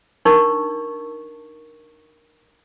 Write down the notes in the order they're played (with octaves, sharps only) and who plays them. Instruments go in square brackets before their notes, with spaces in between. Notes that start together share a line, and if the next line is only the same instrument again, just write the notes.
[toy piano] D4 D#4 A#4 C#6